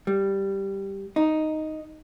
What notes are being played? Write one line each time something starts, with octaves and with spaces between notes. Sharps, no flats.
G3
D#4